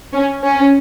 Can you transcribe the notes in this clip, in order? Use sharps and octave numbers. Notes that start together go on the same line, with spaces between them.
C#4
C#4